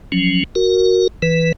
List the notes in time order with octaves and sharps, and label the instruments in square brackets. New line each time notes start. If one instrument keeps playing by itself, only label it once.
[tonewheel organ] F3 F#3 C#4
F#4 A#4
E3 B4